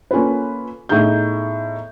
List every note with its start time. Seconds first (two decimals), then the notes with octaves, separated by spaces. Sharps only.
0.11 A#3 C#4 F4 A4 B4
0.89 A2 B3 D#4 G#4 G6